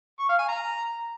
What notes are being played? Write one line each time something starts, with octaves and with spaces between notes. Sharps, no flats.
C#6
F5
G#5
A#5